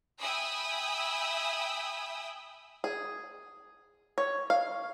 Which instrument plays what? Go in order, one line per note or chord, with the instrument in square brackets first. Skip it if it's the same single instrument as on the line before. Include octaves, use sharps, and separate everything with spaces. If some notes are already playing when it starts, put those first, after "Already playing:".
[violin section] E5 G5 G#5 B5 D#6 E6
[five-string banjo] G#4
C#5
F5